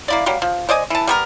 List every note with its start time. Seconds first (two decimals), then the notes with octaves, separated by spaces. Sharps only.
0.08 A#3 E4 D5
0.26 F#3 G3 A#3
0.42 F3
0.69 C5 D5 D#5 G#5
0.90 E3 A5
1.07 G3 B3 A#4